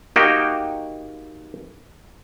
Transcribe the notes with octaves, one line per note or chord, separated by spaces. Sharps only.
A#3 D#4 F#4 G4 G5